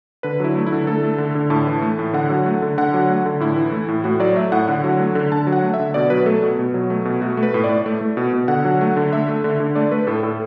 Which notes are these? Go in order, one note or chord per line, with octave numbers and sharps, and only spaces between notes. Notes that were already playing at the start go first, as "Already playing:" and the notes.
D3 B4
F#3 E4
A3
E4
D3
A3 A4
A3
D3
D3
A2 A5
E3
A3
A2
D3 F#5
F#3
A3
D3
D3 F#5
F#3
A3
D3
A2 E4
E3
A3
A2
A2 F#4
F#3 D5
A3 E5
A2 F#5
D3 F#5
F#3
A3
D3
D3 A5
F#3
F#5
A3
E5
D3
B2 D5
F#3 B4
A3 A4
B2
B2
F#3
A3
B2
A3 F#4
A3
B4
A2
D5
A2
A3
A3
B2
B2
D3 F#5
F#3
A3
D3
A3 E5
A3
D3
D3
A3 D5
A3 B4
A2 A4
A2 A4